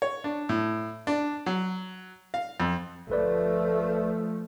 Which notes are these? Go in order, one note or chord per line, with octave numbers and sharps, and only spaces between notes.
C#5
D4
A2
D4
F#3
F5
F2
G1 F3 A3 B4 D5